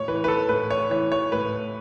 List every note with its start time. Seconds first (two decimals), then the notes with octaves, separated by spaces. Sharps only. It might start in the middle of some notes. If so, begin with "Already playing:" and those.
Already playing: A2 C#5
0.08 E3 B4
0.24 B4
0.28 A4
0.49 A2 B4
0.70 C#5
0.90 E3 C#5
1.12 C#5
1.32 A2 B4